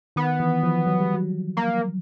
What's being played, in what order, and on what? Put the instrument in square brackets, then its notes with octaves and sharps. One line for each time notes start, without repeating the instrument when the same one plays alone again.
[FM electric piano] D#3 [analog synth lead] B3
[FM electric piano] E3
F3
F#3
G3
F#3
[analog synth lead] A#3